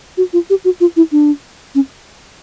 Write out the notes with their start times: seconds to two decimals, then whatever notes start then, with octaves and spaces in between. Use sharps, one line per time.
0.17 F#4
0.33 F4
0.50 G4
0.65 F#4
0.80 F4
0.97 E4
1.12 D4
1.75 C#4